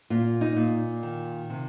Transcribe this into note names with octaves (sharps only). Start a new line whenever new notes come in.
A#2 F4
D#4
A#2
D#3
C3